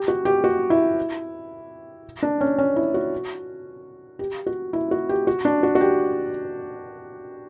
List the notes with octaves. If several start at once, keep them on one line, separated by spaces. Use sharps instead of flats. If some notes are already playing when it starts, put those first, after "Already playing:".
Already playing: G4
F#4
G4
F#4
E4
D4
C#4
C#4
E4
F#4
G4
F#4
E4
F#4
G4
F#4
D4
F#4
F#4
G4